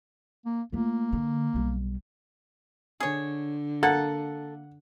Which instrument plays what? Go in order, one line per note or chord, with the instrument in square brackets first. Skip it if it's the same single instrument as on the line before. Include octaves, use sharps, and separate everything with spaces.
[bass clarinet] A#3
[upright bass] A3 F4 [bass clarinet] A#3
[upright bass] D3
B1 G3
[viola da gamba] D3 [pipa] G#4 C#5
[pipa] A#3 [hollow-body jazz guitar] A4 [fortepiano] F#5